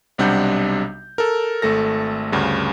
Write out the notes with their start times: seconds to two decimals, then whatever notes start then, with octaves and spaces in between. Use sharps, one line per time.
0.18 B1 C3 G3 D4 F#5 G6
1.18 A4 A#4
1.62 G#1 A3 A4 A#6
2.32 D2 G2 C#3